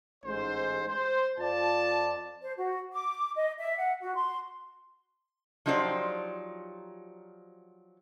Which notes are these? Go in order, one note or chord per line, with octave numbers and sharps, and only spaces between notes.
A1 G#2 C5
C5
F2 F3 F4 D5 A5
C5
F#4
D6
D#5
E5
F#5
F#4
C6
F3 F#3 D#4 G4 C5 D5